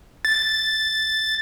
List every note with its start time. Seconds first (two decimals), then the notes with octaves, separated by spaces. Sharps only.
0.25 A6